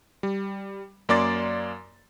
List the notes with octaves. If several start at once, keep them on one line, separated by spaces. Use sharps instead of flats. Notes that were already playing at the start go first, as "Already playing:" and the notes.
G3
F#2 A#3 D5 C6 D6 A6